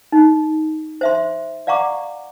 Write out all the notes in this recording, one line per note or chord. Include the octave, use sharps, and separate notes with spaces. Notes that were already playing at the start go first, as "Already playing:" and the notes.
D#4
C5 E5 C6
D5 F5 F#5 A#5 C#6 D6